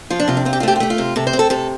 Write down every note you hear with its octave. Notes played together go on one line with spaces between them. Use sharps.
F3 F4
D4
C3 F4
D4
C4 F4
G4
F4
A3 G4
F4
A3 G4
F4
C3
C3 A4
C5
C4
A4
C3 A4